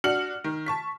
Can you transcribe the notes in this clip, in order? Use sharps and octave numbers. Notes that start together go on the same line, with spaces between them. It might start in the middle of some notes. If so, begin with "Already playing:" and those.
D4 F#4 F6 C#7 F#7
D#3
A5 C#6 B6